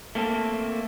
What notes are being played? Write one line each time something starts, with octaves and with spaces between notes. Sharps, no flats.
A3 A#3 C4 A4